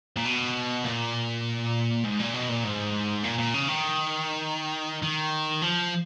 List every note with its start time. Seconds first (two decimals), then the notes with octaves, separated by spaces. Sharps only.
0.16 A#2
0.25 B2
0.85 A#2
2.05 G#2
2.19 A#2
2.34 B2
2.49 A#2
2.64 G#2
3.24 A#2
3.38 A#2
3.54 C#3
3.68 D#3
5.03 D#3
5.62 F3